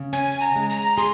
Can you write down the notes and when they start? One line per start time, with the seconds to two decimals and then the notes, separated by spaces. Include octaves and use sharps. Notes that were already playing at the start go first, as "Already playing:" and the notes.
Already playing: C#3
0.13 C#4 G#5
0.41 A#5
0.56 G#3
0.70 A#5
0.98 G#4 C6